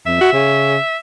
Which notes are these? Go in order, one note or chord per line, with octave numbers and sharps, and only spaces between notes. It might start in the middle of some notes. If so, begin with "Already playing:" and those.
F2 E5
F#4
C#3